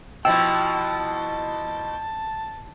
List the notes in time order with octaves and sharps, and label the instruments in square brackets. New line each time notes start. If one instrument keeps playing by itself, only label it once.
[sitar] B2 F3 E4 [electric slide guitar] G5 [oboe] A5 [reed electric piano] E6